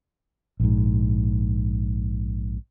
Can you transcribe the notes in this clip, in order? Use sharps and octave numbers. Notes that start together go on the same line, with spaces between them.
A#1 G#2